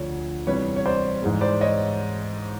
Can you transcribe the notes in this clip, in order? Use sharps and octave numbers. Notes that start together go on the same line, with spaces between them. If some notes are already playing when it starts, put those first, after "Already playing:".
Already playing: D2 D3 F3 C#5
E2 C3 E3 G3 B4 C#5
C#5
C5 D5
G#2 E3 G#3
C5 D5
C#5 D#5